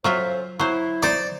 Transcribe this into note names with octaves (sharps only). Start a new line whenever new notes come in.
F#3 C#4 F4 A4 C5 E5
F#3 E4 C5
D#4 C5 D5